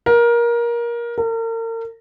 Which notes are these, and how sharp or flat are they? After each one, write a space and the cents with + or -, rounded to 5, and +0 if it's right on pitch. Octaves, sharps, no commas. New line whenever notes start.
A#4 +20
A#4 -40